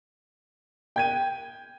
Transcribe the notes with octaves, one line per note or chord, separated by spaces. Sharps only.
G5 G#6 D#7